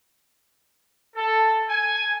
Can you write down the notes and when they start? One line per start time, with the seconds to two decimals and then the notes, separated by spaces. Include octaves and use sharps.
1.16 A4
1.69 G#5